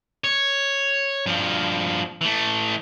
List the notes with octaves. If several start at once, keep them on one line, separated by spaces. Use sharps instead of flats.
C#5
G2 F3
E3 A3